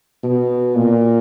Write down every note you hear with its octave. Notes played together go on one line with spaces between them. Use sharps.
B2
A#2